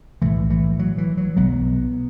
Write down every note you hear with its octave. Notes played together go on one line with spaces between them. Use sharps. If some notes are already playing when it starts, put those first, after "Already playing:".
B1 A2 E3 A3
E3 A3
F#3
E3
F#3
B1 B2 F#3 B3